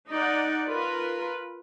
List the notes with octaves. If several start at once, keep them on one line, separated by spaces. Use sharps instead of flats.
D#4 D5 F#5
F4 A#4 B4